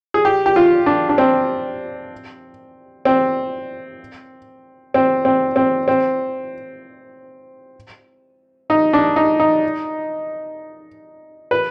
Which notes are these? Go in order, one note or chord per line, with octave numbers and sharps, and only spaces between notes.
G#4
G4
G4
F4
D4
D4
C4
C4
C4
C4
C4
C4
D#4
D4
D#4
D#4
B4